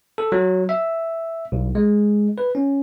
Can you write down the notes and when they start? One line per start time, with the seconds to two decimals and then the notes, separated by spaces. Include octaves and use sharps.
0.18 A4
0.32 F#3
0.69 E5
1.52 B1
1.75 G#3
2.38 B4
2.55 C#4